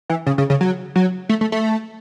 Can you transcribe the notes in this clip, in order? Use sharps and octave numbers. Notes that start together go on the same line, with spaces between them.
E3
C#3
C#3
C#3
F#3
F#3
A3
A3
A3